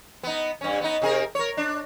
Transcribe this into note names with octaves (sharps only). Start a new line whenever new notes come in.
B3 D#4
G2 C#4
B3 D#4
C3 G#4 A#4
A#4 C#5
D4